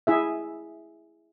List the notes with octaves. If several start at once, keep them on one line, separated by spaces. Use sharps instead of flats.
E4 G#4 E5